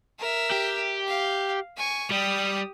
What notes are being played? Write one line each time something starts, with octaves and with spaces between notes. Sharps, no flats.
A#4 E5
G4
F5
G#5 C#6
G3 G4 D#6